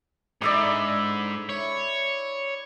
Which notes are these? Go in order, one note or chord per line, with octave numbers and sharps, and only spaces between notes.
G#2 D3 E4 D5 E5 D#6
E4 C#5